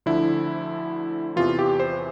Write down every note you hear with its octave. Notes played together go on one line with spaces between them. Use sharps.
D2 D3 F3 E4
E2 C3 E3 F4
G4
C5